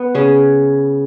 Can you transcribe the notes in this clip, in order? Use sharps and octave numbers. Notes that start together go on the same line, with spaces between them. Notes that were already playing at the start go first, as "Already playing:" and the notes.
Already playing: B3
C#3 C#4